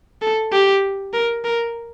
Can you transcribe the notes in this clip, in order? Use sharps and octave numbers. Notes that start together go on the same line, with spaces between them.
A4
G4
A#4
A#4